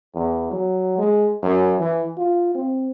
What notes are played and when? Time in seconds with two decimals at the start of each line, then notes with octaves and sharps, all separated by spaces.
0.15 E2
0.51 F#3
0.98 G#3
1.43 F#2
1.79 E3
2.17 F4
2.55 C4